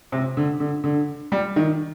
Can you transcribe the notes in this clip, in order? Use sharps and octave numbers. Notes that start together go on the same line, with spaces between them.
C3
D3
D3
D3
G3
D#3